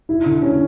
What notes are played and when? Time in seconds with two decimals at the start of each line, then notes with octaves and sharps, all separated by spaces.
0.09 E4
0.26 D3
0.42 C#4